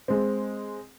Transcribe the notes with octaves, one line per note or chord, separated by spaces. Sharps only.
G#3 C4